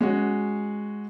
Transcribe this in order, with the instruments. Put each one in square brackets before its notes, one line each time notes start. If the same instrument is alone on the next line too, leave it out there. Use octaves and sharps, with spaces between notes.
[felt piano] G#3 C#4 F#4